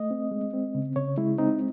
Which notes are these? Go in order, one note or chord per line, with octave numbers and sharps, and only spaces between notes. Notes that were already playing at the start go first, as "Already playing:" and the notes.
Already playing: A3 D#5
C4
G#3
C4
C#3
C#3 C#5
G#3 E4
C4 D#4